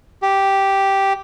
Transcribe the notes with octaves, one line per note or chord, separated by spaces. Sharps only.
G4